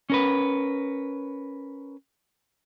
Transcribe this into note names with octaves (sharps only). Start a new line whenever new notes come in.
C#4 A#4 B4